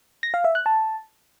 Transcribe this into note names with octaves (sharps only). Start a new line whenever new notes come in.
A#6
F5
E5
F#6
A5